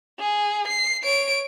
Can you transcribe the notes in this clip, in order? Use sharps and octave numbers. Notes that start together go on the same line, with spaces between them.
G#4
C7
C#5 D7